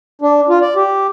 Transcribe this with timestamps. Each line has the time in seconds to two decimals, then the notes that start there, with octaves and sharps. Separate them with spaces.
0.22 D4
0.49 F4
0.61 D5
0.76 G4